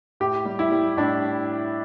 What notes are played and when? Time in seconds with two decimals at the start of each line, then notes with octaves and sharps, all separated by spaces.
0.20 A2 G4
0.46 G3
0.59 E4
0.71 G3
0.97 A2 D4